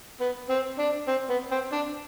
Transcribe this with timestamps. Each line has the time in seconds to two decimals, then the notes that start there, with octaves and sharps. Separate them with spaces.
0.20 B3
0.49 C4
0.79 D4
1.08 C4
1.30 B3
1.51 C4
1.73 D4